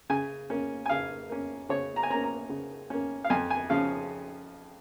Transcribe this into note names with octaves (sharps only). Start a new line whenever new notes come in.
C#3 G#5
A#3 C#4
G#5
C#3 F5
A#3 C#4
C#3 C#5
A#5
G#5
A#3 C#4 A#5
A#5
C#3
A#3 C#4
F5
F2 G#5
G#5
C#3 F3 C#4 F5